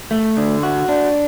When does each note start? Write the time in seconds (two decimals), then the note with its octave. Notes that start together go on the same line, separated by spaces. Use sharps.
0.11 A3
0.37 D3
0.63 F#4
0.89 D4